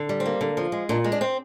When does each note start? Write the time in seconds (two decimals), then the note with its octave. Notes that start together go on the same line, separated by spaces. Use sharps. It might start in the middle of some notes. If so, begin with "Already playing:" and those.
Already playing: D3
0.09 G3
0.20 C4
0.26 A#3
0.41 D3
0.57 F3
0.72 G#3
0.89 A#2 D4
1.04 G#3
1.12 D4
1.21 C4